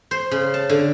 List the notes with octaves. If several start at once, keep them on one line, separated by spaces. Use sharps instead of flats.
C5
C#3
A5
D3